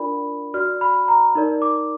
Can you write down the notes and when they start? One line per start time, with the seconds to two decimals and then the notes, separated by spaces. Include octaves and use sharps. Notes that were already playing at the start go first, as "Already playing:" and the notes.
Already playing: D4 F4 A#4 D5 B5
0.54 F#4 D5 F6
0.81 B5
1.08 A#5
1.35 D#4 A#4 D5
1.62 D6